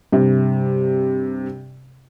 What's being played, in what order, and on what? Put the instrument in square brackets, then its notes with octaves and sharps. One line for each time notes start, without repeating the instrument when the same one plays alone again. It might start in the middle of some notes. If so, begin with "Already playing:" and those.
[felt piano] G2 C3